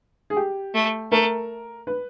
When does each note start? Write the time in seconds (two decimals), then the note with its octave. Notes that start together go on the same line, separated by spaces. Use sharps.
0.30 G#4
0.37 G4
0.75 A3
1.12 A3 A#4
1.87 B4